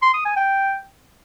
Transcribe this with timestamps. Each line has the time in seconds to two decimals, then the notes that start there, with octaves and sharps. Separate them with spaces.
0.02 C6
0.14 D#6
0.25 G#5
0.37 G5